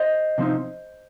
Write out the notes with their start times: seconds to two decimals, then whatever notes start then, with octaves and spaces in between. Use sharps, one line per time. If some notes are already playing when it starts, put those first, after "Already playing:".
Already playing: C5 D#5
0.38 C3 F3 C4 D#4